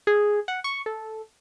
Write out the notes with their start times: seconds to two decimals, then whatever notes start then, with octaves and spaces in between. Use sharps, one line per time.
0.07 G#4
0.48 F#5
0.64 C#6
0.86 A4